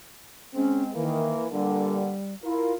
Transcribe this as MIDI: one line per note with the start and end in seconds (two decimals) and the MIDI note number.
0.55 0.91 56
0.55 0.91 60
0.55 0.83 61
0.95 1.35 51
0.95 1.48 52
0.95 1.48 58
1.52 2.11 43
1.52 2.11 46
1.52 2.11 50
1.52 2.34 55
2.44 2.73 64
2.44 2.75 65
2.44 2.75 70